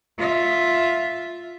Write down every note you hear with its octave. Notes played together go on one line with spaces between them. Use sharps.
F4 E5